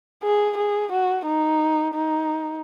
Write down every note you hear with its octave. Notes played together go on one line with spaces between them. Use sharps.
G#4
G#4
F#4
D#4
D#4